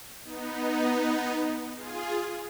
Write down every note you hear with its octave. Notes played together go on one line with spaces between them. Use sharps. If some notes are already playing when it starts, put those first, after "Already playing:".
B3 D#4
F4 G#4